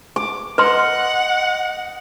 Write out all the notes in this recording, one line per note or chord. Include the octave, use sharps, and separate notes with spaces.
D6
B4 D#5 F#5 C6